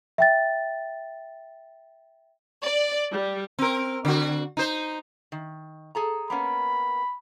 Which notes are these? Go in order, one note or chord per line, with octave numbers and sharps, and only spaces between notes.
E5 G5 A6
D5
G3
C4 A#4
D3 F#4
D#4 C5
D#3
G#4 A4 A#5
A#3 B3 C#4 B5